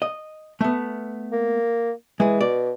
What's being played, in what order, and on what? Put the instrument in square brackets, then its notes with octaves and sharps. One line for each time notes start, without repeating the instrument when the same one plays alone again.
[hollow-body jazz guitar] D#5
A3 B3
[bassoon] A#3
[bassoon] E3 [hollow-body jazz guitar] G#3 G#4
[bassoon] B2 [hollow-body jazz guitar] D5